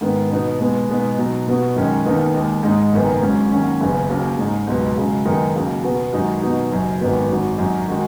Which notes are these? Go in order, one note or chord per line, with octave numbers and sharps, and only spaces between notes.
G#2 D#3 B3
B2 B3 D#4 F#4
B2 G#3 B3
B2 G#3 B3 D#4
B2 F#3 D#4
B2 B3 F#4
F#2 D#3 G#3 C#4
D#2 D#3 B3 D#4
D#2 D#3 G#3
G#2 G#3 D#4
F#1 F#2 D#3 B3
G#1 G#2 F#3 C#4
D#2 D#3 F#3 C#4 F#4
F#1 F#2 C#3 B3
D#2 C#3 F#3 C#4
G#2 G#3 D#4
C#2 B2 F#3 B3
C#2 C#3 F#3
F#2 D#3 G#3 B3 D#4
D#2 C#3 F#3
B2 B3 F#4
F#2 D#3 G#3 D#4 F#4
B2 F#3 B3 D#4 F#4
F#1 F#2 F#3
G#1 F#2 D#3 B3 F#4
G#1 F#2 F#3 D#4 F#4
F#2 F#3 D#4 F#4
D#3 G#3 D#4 F#4